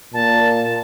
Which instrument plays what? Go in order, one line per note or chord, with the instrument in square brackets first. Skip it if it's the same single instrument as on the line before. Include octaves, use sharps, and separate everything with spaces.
[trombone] A#2 [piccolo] A5